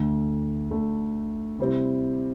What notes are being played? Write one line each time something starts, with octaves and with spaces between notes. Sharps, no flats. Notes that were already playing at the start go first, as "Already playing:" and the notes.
Already playing: D2 D3 A3
D2 D3 A3
C3 G3 C4 E4